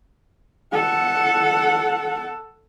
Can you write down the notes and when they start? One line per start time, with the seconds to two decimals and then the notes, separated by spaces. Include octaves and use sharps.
0.73 A4 F#5